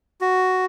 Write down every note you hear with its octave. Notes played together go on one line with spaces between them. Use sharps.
F#4